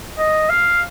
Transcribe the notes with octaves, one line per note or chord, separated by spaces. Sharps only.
D#5
F5